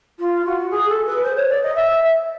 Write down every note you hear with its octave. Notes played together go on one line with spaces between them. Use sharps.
F4
F#4
G#4
A4
B4
C5
C#5
D5
D#5
E5